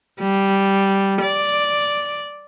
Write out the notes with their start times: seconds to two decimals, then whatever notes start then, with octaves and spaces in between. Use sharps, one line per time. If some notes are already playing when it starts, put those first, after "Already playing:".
0.21 G3
1.21 D5